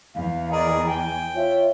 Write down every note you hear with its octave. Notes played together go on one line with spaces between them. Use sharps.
E2 F5
G#4 A#4 D5 D#5
G5 G#5
F4 C#5 E5